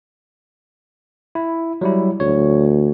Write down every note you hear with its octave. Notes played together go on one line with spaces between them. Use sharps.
E4
F#3 G3 E4
D2 C#5